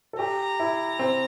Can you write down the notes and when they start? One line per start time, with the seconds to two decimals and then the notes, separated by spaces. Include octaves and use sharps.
0.13 A4
0.19 G4 A#5
0.59 E4
0.99 C4